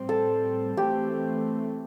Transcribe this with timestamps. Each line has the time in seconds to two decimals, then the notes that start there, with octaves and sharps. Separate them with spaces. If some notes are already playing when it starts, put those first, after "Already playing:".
Already playing: A2 G3 C4
0.09 A4
0.77 E3 A3 C4 G4